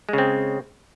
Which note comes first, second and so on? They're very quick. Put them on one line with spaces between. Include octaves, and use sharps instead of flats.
G#3 C#3 C4